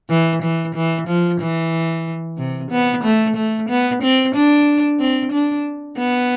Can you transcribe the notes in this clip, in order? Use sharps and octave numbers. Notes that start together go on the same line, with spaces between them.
E3
E3
E3
F3
E3
C3
B3
A3
A3
B3
C4
D4
C4
D4
B3